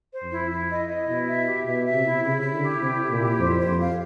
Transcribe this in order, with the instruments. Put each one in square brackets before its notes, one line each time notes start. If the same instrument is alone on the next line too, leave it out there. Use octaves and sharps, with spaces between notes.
[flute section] C5
[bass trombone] F2
[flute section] E4
E4
D#5
D#5
[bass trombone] B2 [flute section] E4
[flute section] E5
G4
[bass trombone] B2 [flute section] E5
[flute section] E5
[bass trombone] C3
[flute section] E4
[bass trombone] C#3 [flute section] E4
[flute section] E4
[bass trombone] D3
[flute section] G4
[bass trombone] C3 [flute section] E4
[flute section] E4
[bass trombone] A#2
[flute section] G4
[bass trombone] F2 [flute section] C5
[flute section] C5
[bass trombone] F2
[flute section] F5